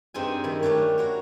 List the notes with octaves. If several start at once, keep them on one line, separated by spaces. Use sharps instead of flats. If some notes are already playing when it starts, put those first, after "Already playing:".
G2 C4 D#4 G#4 E5 G#5
D#3 E4 B5
G3 A3 C#4 D4 C#5
F#4 A#4 C#5